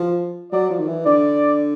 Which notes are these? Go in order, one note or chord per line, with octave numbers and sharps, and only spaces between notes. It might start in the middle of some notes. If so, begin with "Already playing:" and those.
Already playing: F3
F#3 D5
F3
D#3
E3
D3 D5